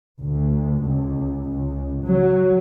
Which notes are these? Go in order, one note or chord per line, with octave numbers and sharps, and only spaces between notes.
D2
C#2
C#2
F#3